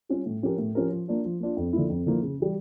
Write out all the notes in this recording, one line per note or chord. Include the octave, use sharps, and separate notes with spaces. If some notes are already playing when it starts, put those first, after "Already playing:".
G3 C#4 F4
A2
F3 C#4 G4 A#4
A2
F3 C#4 G4 A#4
F3
A#3 D4 F4
F3
A#3 D4 F4
F2
D3 F3 A#3 E4
F2
D3 F3 A#3 E4
C#3
E3 G3